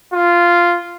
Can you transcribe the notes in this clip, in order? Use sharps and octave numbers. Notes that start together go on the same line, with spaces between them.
F4